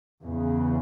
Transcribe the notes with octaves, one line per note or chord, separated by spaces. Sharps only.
E2 C#3